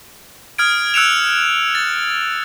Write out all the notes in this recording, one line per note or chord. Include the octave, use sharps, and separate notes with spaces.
D#6 F6 G#6 D7
E6 F#6 C#7 D7 E7 F7
A6